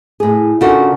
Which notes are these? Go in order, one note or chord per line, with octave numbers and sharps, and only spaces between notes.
A2 G#4
C#3 D4 F4 F#4 A4 A#4